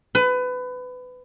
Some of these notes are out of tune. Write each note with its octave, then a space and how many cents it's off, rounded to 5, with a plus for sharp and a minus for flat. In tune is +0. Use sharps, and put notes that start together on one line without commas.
B4 +25